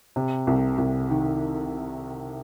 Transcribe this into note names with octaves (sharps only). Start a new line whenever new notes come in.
C3
C2
C2
D#3